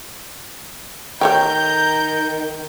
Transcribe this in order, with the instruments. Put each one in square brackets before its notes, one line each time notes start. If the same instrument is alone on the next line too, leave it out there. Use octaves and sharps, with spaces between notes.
[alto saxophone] D#3 [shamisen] A4 C#5 G5 [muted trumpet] A#5 [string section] G6